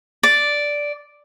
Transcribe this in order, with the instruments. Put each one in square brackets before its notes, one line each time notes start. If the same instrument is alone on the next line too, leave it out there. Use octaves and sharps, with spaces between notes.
[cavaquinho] D5